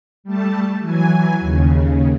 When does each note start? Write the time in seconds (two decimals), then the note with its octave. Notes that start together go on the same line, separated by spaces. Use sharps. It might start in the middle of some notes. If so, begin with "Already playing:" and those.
0.24 G3 A3 A5
0.81 E3 F#3 G#5
1.40 D#2 C#3